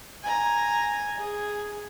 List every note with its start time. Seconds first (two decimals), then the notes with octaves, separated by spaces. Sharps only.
0.22 G#5 A#5
1.19 G#4